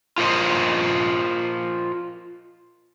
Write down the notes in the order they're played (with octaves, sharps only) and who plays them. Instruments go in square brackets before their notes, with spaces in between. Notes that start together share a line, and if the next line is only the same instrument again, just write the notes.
[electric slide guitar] F4 A#4 C5 D#5